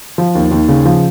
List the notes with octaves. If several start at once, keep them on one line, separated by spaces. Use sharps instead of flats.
F3
D#2
D#2
C#3
F3